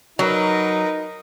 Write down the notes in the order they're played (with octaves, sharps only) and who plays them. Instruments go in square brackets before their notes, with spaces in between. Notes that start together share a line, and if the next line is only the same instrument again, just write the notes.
[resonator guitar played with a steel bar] F#3 [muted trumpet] D#4 [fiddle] A#4 B4